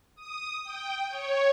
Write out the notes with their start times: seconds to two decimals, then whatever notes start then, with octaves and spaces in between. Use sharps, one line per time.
0.15 D#6
0.64 G5
1.09 C#5